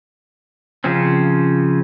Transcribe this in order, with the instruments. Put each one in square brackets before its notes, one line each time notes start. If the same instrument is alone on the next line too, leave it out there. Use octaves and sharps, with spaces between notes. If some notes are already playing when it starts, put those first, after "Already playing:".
[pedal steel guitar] C#3 F3 C4 C#4